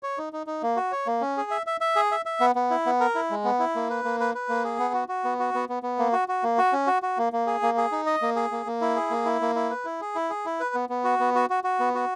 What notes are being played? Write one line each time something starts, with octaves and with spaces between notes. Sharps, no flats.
C#5
D#4
D#4
D#4
A#3
F#4
C#5
A#3
C#4
G#4
E5
E5
E5
G#4
E5
E5
B3
B3
E4
B3
A#4
E4
G#3
B3
E4
A#3
B4
A#3
B4
B4
A#3
G#4
B3
F#4
F#4
B3
F#4
B3
B3
B3
A#3
F#4
F#4
A#3
F#4
C#4
F#4
F#4
A#3
A#3
G#4
A#3
G#4
D#4
D#5
A#3
G#4
A#3
A#3
E4
G#4
A#3
E4
A#3
E4
B4
E4
G#4
E4
G#4
E4
B4
B3
B3
F#4
B3
F#4
F#4
F#4
B3
F#4